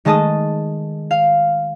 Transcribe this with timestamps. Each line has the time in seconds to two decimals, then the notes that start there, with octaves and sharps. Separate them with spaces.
0.05 D#3 G#3 A3 D#5 A5 D#6
1.11 F5